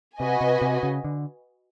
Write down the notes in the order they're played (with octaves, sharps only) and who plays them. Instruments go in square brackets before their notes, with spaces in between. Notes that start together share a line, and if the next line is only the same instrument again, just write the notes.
[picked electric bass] C3 [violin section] F#4 B4 D#5 G#5
[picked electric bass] C3
C3
C#3
D3